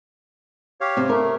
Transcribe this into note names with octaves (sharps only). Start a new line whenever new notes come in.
G4 C#5 F5
C3
A3 A#4